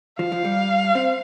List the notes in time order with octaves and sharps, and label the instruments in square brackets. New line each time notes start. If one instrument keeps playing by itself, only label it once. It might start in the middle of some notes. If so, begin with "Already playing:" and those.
[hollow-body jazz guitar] F3 [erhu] F5
[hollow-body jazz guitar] F3
G3
C4